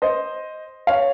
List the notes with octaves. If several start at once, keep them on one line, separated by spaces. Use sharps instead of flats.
C5 D#5
C#5 F5